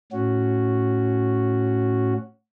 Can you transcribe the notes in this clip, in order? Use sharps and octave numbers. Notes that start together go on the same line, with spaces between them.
A2 C#4 F#4